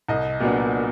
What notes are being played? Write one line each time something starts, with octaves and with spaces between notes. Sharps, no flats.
C2 D#5
A#2 F#3 B3 D4